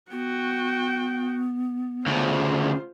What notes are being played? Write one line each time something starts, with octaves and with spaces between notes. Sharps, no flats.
B3 F#4 G5
D2 C#3 F4 C5